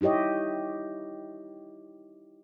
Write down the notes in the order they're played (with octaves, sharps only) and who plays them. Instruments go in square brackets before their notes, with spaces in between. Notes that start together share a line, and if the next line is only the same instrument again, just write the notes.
[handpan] D#4 E4 G4 C#5 D#5